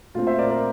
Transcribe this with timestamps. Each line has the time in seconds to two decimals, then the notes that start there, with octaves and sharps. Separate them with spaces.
0.15 A#2 A3 C4 F4
0.27 C5 E5
0.38 A#4 D5
0.50 A#4 D5